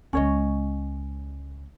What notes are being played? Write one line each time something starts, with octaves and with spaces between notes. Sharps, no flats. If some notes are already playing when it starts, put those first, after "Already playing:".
C#2 G#3 C#4 C#5 D#5